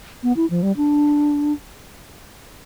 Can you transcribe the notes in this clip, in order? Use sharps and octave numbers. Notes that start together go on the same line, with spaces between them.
B3
E4
F3
G3
D4